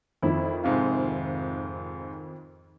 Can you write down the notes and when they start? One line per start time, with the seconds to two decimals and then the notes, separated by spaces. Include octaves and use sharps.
0.22 F2 D#3 E4
0.64 G#2 C3 F5